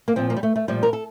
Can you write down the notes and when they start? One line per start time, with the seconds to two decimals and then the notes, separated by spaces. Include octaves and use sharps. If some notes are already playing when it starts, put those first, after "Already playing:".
0.08 A#3
0.16 A#2 F3 C4
0.30 A#3
0.37 G3
0.43 A3
0.56 A3
0.68 A#2 F3 G3
0.83 A#4
0.93 A4